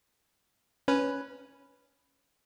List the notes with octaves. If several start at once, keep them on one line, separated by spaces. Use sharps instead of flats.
C#4 B4